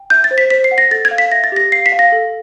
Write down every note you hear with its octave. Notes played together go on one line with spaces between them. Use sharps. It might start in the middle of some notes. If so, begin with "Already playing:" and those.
Already playing: G5
E5 G6
A6
C5
B6
C5 B6
C7
F#5
A#6
A4 A6
G#6
F5
B6
E5 A#6
A6
G4 A#6
F5 C7
B6
F5
A#6
A4